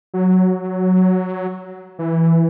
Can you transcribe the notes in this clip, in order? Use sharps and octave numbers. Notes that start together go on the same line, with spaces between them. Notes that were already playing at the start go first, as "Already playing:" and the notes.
F#3
E3